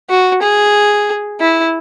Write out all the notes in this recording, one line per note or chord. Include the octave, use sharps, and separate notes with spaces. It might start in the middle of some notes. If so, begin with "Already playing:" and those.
F#4
G#4
E4